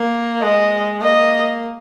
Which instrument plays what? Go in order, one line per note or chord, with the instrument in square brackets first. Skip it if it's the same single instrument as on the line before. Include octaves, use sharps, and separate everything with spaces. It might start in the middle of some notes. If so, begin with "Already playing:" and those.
Already playing: [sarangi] A#3
[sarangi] G#3 [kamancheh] D#5
[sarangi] A#3 [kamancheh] D#5